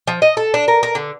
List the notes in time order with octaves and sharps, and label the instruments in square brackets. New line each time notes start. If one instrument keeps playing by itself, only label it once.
[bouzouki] F3
D#5
A4
D4
A#4
A#4
D3